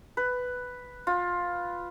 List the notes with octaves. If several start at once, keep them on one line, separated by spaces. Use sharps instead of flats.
B4
F4